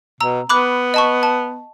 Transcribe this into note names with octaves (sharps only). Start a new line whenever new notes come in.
B2 A#5 E6
B3 B5 D6 F#6
D#5 A5 C#6
A5